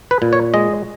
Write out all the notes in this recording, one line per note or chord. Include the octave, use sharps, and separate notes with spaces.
B4
A#2
C#5
G#3 D#5